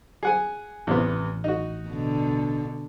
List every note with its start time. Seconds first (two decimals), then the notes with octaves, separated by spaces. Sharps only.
0.23 G#4 F#5 G#5
0.87 A1 E2 C3 B3
1.44 D#4 F#4
1.89 B2 D3